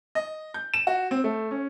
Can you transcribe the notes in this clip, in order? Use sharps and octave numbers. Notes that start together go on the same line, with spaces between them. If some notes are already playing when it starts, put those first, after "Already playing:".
D#5
G6
E7
F#4
C4
A3
C#4